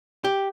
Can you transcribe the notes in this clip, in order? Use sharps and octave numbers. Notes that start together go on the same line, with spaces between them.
G4